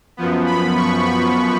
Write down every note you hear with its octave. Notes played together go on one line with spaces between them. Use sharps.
F#2 F3 B3
B5
C#6
B5